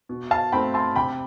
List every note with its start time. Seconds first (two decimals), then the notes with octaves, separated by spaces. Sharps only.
0.09 B2
0.31 F5 A5
0.52 A3 C4 G5 B5
0.74 A5 C6
0.96 C3 G5 B5